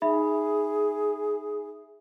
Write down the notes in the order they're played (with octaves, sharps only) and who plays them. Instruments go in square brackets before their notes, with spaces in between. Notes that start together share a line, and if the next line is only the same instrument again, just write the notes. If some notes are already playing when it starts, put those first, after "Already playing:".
[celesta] D#4 E5 B5 [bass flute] G#4